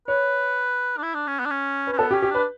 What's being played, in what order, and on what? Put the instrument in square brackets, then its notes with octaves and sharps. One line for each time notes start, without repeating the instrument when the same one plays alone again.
[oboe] B4 [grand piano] C#5
[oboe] D4
E4
D4
C#4
B3
D4
C#4
[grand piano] B4
[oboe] C#4
[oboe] B3 [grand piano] A4
[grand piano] G4
[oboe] C#4
[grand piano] G4
[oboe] D4 [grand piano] B4